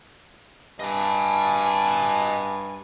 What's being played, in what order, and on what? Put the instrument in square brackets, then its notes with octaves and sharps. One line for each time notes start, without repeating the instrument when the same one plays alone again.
[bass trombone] G2 [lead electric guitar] D#5 A5 [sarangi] G#5